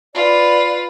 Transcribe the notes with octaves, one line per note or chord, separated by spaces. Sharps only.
F4 B4 D5